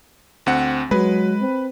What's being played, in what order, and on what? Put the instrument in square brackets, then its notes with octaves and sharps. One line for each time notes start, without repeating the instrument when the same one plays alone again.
[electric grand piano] D2 C4 F#5
[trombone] F#3 [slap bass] G#3 [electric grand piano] B4
[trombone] C4